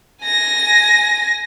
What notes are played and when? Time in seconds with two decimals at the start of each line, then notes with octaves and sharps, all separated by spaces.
0.25 G#5 A#6